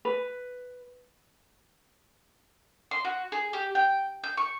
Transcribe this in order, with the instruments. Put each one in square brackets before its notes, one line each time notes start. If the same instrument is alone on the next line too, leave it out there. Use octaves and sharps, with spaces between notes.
[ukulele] B4
[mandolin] C6
F#4
G#4
G4
G5
G6
C#6